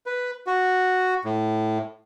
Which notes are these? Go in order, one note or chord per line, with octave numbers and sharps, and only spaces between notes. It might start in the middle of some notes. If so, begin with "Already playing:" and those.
B4
F#4
A2